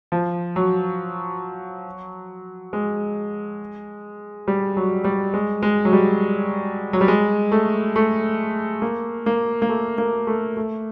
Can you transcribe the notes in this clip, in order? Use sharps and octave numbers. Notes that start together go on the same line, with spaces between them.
F3
F#3
G#3
G3
F#3
G3
G#3
G#3
F#3
G3
F#3
G3
G#3
A3
A3
A#3
A#3
A#3
A3
A#3
A3
A3